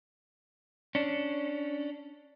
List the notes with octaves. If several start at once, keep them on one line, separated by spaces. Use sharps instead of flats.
C#4 D4